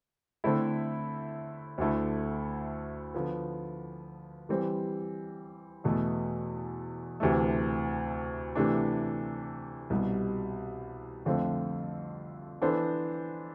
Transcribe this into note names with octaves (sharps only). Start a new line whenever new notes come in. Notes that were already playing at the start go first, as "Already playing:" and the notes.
D3 A3 C4 E4
D2 D3 A3 E4
D3 F3 B3
E3 G3 C4
E2 B2 A3
D2 C3 E3 A3
C3 E3 A3 D4
C2 B2 G3
F2 D3 A3 C4 F4
E3 B3 D4 A4 C5